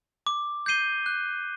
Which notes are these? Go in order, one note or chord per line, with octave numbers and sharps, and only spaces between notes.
D6
G6 C7 D#7 G7
F#6